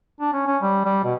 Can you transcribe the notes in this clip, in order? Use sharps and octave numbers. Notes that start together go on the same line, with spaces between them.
D4
C#4
C#4
G3
G3
B2